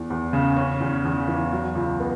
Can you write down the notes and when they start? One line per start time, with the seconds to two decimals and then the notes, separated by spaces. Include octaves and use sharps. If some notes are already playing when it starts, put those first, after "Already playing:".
Already playing: E2 E3
0.10 E2
0.33 C#3
0.57 C#4
0.80 E2
1.05 E2
1.28 E3
1.53 F#3
1.75 C#2
2.00 B3